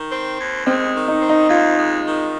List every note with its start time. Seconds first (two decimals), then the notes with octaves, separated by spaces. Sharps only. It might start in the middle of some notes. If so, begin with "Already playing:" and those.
Already playing: D#3
0.12 C4
0.40 D#2
0.67 G#3 C4
0.95 D#3
1.08 D#4
1.22 C4
1.29 D#4
1.50 D#2 F4
1.78 G#3
2.05 D#3